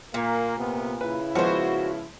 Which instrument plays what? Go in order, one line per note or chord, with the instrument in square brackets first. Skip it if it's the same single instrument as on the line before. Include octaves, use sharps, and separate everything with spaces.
[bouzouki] A#2 [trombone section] A#3
[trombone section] C3 B3
[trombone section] C#3 E4 [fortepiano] B4
[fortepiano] F3 G#3 B3 [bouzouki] F#4 C5